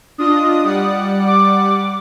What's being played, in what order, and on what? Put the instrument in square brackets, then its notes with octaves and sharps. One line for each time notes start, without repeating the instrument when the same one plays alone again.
[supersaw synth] D4 F4 D#5 [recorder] D#6
[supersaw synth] G3 D5 F#5
[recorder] D6